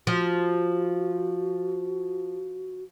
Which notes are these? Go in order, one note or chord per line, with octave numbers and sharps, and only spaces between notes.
F3 F#4